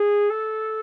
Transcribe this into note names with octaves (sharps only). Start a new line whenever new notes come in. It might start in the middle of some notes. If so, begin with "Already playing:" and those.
Already playing: G#4
A4